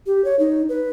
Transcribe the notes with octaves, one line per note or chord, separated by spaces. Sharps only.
G4
C#5
D#4
B4